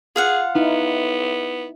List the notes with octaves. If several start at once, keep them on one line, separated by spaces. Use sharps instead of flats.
F4 G#4 F5 F#5
B3 D#4 E4